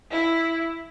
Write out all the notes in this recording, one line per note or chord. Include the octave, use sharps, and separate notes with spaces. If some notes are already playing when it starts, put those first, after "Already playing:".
E4